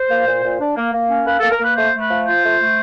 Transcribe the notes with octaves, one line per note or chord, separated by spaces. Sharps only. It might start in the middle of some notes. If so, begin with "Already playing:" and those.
Already playing: C5
A#3
A#2
A#2
D4
A#3
A#3
C#4
A#3 B4
A#3 A4
A#4
A#3
B4
A3 C5
A3
B4
F3
F4 C5
A3
A3